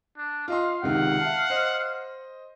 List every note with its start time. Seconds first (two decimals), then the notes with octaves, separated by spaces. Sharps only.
0.17 D4
0.48 F4 D#5 F5 C6
0.83 C#2 C3 D#3 F#5
1.21 E5 A5
1.50 C5 D#5